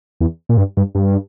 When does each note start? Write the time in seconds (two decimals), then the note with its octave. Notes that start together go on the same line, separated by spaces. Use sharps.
0.21 E2
0.49 A#2
0.57 G2
0.77 G2
0.95 G2